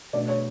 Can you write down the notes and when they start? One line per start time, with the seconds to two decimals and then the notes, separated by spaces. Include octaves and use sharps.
0.13 B2 A3 D4 D5
0.28 C#5